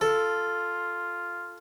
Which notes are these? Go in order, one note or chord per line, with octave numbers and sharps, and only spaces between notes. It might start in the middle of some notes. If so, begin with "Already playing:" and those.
F4 A4